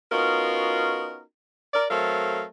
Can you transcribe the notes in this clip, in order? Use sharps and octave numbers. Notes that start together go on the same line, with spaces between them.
B3 C#4 D#4 F4 F#4 A#4
A#4 D5
F#3 A3 C4 A4 A#4 F5